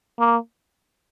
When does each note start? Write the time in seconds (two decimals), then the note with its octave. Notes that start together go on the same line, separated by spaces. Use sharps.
0.19 A#3